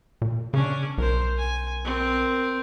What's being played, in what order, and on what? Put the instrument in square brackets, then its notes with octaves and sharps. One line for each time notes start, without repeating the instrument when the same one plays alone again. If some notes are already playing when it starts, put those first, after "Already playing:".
[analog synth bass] A#2
[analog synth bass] C#3 [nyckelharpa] C#4 D4
[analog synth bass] B1 [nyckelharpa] A#4 C5
[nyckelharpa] G#5
C4 A#4